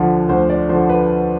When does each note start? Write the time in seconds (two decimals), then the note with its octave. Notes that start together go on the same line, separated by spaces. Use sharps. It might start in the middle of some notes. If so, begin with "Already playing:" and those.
Already playing: D2 D3 F3
0.29 D2 C5
0.50 D5
0.69 D3 F3 C5
0.89 B4